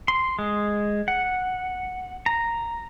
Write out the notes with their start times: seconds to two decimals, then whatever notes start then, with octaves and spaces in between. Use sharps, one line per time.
0.08 C6
0.39 G#3
1.08 F#5
2.26 A#5